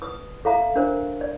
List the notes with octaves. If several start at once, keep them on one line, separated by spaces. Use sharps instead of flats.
B4 D#6
A4 E5 F5 A#5
D4 A#4 C5
D5